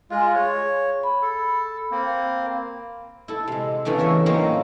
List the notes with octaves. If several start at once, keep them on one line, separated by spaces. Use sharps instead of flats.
G#3 F4 F5 G#5
G#4 C#5
B5
A4
A#3 C4
E4 A4
C3 G#3
E2 C#3 E3 A3 D4
A#4 C#5 E5
A2 F#3 A#3 C4 C#4 D#4